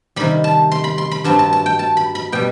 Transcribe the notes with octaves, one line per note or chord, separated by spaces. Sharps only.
C3 D#3 G3 B5
A5
C6
B5
C6
B5
G2 F#3 C4 A5
A5
A5
G5
A5
B5
B5
B2 G3 G5